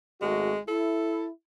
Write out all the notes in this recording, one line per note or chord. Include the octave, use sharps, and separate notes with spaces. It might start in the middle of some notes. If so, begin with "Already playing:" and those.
G#1 G#3 A3 F#4
E4 A4